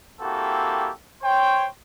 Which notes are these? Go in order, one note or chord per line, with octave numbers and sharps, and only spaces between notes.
A#3 C4 E4 F#4 G4 A4
C5 C#5 G5